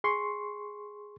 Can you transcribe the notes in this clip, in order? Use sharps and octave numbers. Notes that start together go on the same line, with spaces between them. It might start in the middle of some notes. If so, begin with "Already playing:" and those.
G#4 C6 C#6